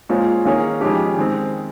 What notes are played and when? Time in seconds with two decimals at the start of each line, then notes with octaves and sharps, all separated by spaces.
0.09 A#2 G#3 C#4 F4 C5
0.45 D#3 A#3 C#4 G#4 C#5
0.81 F2 D#3 G#3 C#4 G4
1.17 D#3 G#3 C4